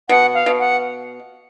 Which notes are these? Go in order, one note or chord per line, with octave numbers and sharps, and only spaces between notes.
B2 F#5
F5
B2
F#5